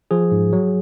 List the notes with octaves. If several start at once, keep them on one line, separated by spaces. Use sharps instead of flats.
F3 G#4
G#2
F#3